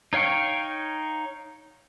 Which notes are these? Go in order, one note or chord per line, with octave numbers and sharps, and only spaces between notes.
D#4 C#5 F5 G5 C#6